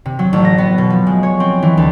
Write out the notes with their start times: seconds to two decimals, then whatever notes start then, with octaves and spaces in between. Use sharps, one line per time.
0.06 C3
0.19 F#3
0.33 A1
0.45 A#6
0.58 B3
0.78 B2
0.90 F3
1.07 G#3
1.23 C#5
1.40 C4
1.62 E3
1.77 D2